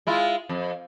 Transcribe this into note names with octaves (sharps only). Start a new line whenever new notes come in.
G#3 E4 F4
F2